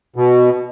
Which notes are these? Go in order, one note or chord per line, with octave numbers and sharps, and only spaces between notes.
B2